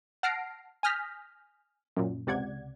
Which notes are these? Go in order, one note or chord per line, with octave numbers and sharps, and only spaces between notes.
F#5 A5 F6 A#6 C7 D7
G#5 D#6 F6 G6 A#6 B6
F#2 A#2
C#2 C3 D5 F#5 G#6